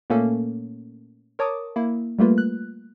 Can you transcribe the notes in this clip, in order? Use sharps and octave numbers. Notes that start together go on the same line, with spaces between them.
A#2 A3 A#3 C#4 A4
A#4 C#5 A5 D6 D#6
A#3 E4
G3 A3 A#3 F4 B4
F#6